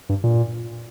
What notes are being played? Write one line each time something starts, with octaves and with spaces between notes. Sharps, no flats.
G2
A#2